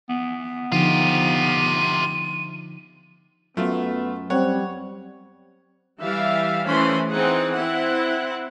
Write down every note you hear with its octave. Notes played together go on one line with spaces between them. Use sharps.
B3
D3 F3 D#4 F4 G4 D#7
F#2 A3 B3 F4
G3 C4 C#5 F#5
E3 G3 E5 F5
E3 A3 C#4 C5 B5 C6
E3 C4 D#4 G#4 F#5
C4 E4 F#5